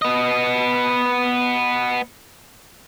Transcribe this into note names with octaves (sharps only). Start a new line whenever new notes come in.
B3 D#5